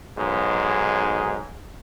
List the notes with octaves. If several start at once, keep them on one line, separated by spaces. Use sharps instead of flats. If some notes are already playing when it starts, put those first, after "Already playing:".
B1 G#2 G#4